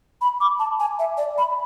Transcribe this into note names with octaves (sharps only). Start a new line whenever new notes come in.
B5
D6
A5
G#5
E5
D5
B5